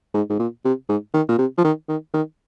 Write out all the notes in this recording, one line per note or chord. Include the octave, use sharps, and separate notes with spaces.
G#2
G#2
A#2
C3
G#2
D#3
A#2
C3
F3
D#3
D#3
D#3